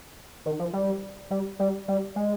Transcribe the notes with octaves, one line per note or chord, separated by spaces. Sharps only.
D#3
F3
G3
G3
G3
G3
G#3